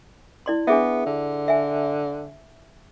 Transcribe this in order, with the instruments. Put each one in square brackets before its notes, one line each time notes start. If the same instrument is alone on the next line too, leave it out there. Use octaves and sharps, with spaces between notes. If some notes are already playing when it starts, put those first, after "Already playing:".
[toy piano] E4 D5 C6
[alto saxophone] B3 [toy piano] D4 G#4 E5
[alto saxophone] D3
[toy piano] E5 G#5